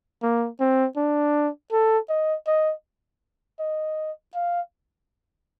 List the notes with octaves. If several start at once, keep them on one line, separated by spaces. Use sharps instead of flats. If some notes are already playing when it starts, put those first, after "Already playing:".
A#3
C4
D4
A4
D#5
D#5
D#5
F5